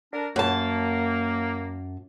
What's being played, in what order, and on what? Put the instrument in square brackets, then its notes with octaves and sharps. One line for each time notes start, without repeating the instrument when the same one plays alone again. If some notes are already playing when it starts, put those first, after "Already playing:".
[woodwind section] D4 A#4
[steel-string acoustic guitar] F#2 A5 [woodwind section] A#3